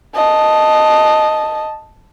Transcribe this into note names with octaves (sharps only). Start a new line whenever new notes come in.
D#5 A5